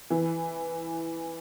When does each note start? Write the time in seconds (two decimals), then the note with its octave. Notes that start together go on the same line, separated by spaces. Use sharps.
0.10 E3